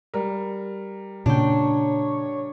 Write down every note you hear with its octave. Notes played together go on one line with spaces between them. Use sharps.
G3 A#4
A#2 C#3 D4 C#5 G5